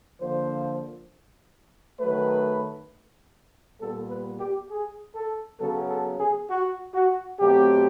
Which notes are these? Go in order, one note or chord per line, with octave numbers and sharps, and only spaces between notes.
D3 F3 A#3 C5
D#3 F#3 A3 B4
A#2 G3 B3 A4
B4
G4
G#4
A4
C#3 F#3 B3 A4
A4
G#4
F#4
F#4
B2 F#3 A3 C4 G4